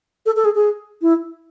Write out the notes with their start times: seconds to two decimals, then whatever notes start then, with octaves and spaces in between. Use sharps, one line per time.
0.26 A4
0.36 A4
0.45 G#4
0.55 G#4
1.02 E4